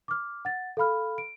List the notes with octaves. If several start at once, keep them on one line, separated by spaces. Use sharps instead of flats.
D6 F6
F#5 A6
A4 F5 B5 F6
D7